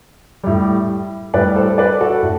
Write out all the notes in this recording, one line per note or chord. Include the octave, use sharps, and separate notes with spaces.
A2 G3
A2 G3 B4 D5
A4 C5
B4 D5
F#4 A4
A2